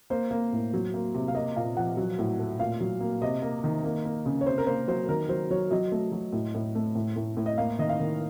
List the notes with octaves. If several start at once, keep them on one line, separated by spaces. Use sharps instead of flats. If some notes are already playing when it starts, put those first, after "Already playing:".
A#3 C5
A#3
A2
F#3
A#3
C3
F5
A#3 D#5
A#2 F5
F3 F#5
F#3
A2
A3
A#2 F5
F#3
A#3
C3 D#5
A#3
D#3
A#3
A#3
C#3
C#5
C3 C5
A#4
A#3 C5
F#3 C5
D#3 A#4
F#3 C5
F#3 C#5
F#3 D#5
A3
F#3
A2
A2
A3
A2
A2
A2
D#5
A#3 F5
D#3 D#5
F5
D#3